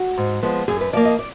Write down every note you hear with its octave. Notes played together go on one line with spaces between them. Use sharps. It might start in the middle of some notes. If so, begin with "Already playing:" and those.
Already playing: F#4
G#2
F3 G#3 B3
F#2 G#4
B4
F3 A#3 D5
D#5
D5